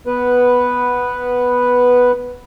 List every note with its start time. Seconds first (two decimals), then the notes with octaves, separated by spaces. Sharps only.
0.07 B3 B4